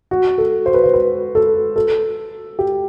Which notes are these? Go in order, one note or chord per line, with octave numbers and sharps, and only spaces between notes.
F#4
A4
C5
B4
C5
B4
A4
A4
G4